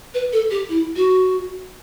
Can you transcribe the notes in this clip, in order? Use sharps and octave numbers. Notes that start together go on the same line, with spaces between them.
B4
A4
G4
E4
F#4